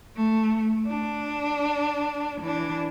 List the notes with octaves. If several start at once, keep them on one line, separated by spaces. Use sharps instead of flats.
A3
D4
E3 D4